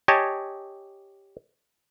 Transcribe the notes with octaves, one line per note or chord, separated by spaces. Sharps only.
G4 C#5 D#5 G#5 A5